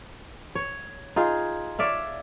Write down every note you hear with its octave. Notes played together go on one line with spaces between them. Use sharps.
C#5
D#4 F4 G#4
C#5 D5 E5 F5